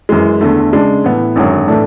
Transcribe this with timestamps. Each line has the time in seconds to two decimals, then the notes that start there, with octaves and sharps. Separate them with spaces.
0.09 F#2 E3 G#3
0.41 E2 D3 A3
0.72 C#3 G#3 D4
1.04 A2 E3 B3
1.36 G#1 F#2 D3 F#3
1.68 A2 E3 A3 D4